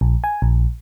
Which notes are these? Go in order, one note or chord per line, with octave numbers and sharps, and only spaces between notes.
A#1
G#5
A#1